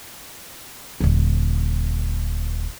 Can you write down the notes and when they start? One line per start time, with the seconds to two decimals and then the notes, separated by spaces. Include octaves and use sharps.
1.00 D#1 D3